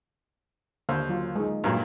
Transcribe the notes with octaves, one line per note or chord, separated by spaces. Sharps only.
D#2 D3 A#3 C5
F#3 F4
G#3 D#4
G2 A#2 F#3